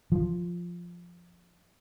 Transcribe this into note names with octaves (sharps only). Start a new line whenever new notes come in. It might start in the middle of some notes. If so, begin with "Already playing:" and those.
F3